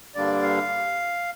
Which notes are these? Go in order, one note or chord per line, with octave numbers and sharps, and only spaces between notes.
G2 D3 G3 A#3 D4 D5
F5